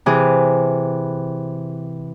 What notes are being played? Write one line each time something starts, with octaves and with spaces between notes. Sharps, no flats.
C3 E3 G#4